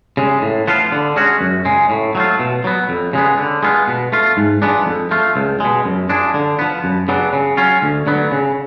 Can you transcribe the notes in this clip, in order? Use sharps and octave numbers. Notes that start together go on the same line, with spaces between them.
C#3 G#3
A2
F3 B3 F4
D3
G#3 C#4 F#4
F#2
C#3 G#3
A2
F#3 A3 F4
B2
F#3 B3
F2
C#3 G#3 B3
D3
G#3 B3 F4
B2
A3 F4
G#2
F3 G#3 B3 D4
F2
F3 A3 F4
C#2
B2 G#3
F#2
F3 G#3 D4
D3
F3 B3
F#2
C#3 F#3 B3 D4
C#3
F#3 C#4 F4
D2
D3 F#3 B3
C#3